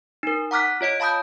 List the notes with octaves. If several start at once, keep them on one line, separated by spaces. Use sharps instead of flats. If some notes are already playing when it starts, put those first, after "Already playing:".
D#4 A#4
F#5 A#5 D6 F6 F#6 B6
F4 C#5 D#5 D7
F5 A5 B5 D#6 G6